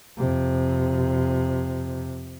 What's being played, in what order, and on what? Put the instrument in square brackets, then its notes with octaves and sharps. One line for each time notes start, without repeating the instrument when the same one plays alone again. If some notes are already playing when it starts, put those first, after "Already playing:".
[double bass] F2 C3